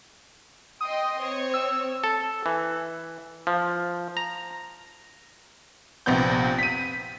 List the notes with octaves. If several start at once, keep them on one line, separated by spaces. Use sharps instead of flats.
D#5 G5 C6 D#6
C4 C#5
E6
A4
E3
F3
A#5
A#1 C3 B3 G6
B6 D#7